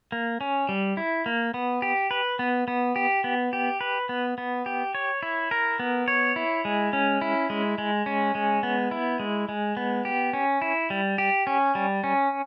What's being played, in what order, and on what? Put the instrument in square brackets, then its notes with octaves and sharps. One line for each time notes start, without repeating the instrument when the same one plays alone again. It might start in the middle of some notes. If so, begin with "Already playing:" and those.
[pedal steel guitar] A#3
C#4
G3
E4
A#3
B3
G4
B4
B3
B3
G4
B3
G4
B4
B3
B3
G4
C#5
E4
A#4
B3
C#5
E4
G#3
C#4
E4
G#3
G#3
C#4
G#3
B3
E4
G#3
G#3
B3
G4
C#4
E4
G3
G4
C#4
G3
C#4